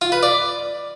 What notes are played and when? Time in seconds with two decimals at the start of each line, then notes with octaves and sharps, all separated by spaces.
0.02 F4
0.12 B4
0.23 D5